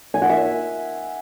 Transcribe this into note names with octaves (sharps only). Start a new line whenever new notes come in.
G#5
F#5
E5